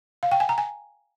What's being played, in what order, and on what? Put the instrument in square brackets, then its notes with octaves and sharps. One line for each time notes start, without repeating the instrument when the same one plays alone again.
[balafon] F5
G5
G#5
A#5
G#5